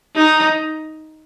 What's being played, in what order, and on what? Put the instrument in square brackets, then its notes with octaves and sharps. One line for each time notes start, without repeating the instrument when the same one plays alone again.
[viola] D#4